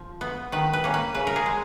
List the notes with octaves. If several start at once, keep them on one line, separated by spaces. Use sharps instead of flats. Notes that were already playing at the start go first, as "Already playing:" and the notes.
Already playing: F3
B3
D#3 B4
B4
A#3 C#4
B4
C#3 B4
A#4
G#4
G#3